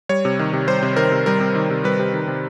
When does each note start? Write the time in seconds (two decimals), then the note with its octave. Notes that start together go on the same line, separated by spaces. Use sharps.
0.09 G3 C#5
0.25 C3
0.39 D#3
0.53 C3
0.67 G3 C5
0.83 C3
0.96 D#3 A#4
1.12 C3
1.26 G3 A#4
1.40 C3
1.55 D#3
1.70 C3
1.84 G3 B4
1.99 C3
2.14 D#3
2.28 C3